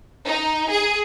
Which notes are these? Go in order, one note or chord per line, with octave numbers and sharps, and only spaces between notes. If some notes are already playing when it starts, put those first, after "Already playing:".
D#4
G#4